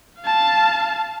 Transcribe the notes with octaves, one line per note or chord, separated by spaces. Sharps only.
F5 A5